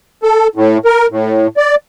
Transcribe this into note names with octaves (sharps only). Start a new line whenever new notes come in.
A4
A2
A#4
A2
D5